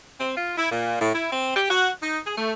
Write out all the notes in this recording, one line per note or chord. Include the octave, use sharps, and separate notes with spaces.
C4
F4
E4
A#2
A2
E4
C4
G4
F#4
D#4
G#4
A3